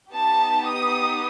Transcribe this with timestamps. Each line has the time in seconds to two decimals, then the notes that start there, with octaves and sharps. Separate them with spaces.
0.13 B3 D#4 G4 A5
0.68 D#6